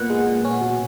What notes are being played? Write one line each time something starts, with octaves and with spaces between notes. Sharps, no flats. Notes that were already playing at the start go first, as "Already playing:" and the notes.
Already playing: A#2 B3 F#5
G#3
A#2
C#4
B2